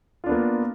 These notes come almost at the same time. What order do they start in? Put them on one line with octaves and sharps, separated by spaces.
F4 D4 B3 A#3